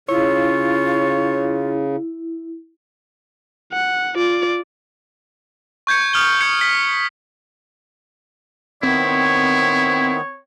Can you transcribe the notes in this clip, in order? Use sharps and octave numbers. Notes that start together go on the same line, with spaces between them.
C#3 E4 F4 C#5
F#5
F4 D5
C#6 G6 G#6 C#7
D#6 F6 F#7 G7
C#6 G6 G#6 C#7
B6
D#3 B3 C4 E4 C#5